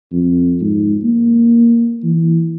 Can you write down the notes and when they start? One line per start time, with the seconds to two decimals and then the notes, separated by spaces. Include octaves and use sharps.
0.13 F2
0.61 G#2
1.04 A#3
2.04 E3